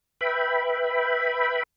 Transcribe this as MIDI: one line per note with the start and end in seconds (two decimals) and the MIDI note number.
0.21 1.63 71
0.21 1.63 76
0.21 1.63 79
0.21 1.63 83